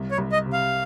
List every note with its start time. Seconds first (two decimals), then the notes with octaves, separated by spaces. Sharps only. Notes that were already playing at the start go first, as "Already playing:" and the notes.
Already playing: C2
0.11 C#5
0.18 C2
0.32 D#5
0.46 C3
0.53 F5